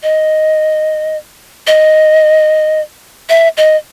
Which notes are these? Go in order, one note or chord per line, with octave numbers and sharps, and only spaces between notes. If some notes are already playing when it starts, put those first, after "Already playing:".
D#5
D#5
E5
D#5